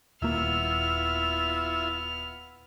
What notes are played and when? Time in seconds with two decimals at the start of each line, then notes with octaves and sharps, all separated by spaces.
0.22 D#1 A#3 B3 E4 F4 E5 F6